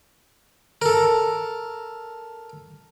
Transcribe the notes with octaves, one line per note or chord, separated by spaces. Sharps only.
A4 A#4